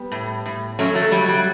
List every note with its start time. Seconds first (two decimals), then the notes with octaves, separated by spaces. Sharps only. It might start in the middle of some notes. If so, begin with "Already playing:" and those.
Already playing: G3 B3
0.12 A2
0.46 A2
0.79 F#3 A3 C#4
0.95 F#3 A3
1.12 F#3 G3
1.28 G3